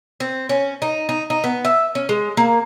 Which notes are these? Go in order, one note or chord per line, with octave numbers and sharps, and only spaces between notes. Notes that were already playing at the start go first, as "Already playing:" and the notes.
C4
C#4
D#4
D#4
D#4
B3
E5
C#4
G#3
A#3